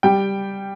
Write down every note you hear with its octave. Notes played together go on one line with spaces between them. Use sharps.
G3 G5